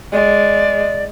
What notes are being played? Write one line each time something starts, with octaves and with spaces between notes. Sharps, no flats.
G#3 D5